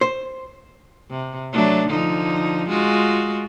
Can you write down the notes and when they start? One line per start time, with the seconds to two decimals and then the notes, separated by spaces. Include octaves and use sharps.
0.01 C5
1.11 C3
1.53 F#3 A3 D4
1.89 D3 F3 D#4
2.69 G#3 F4 F#4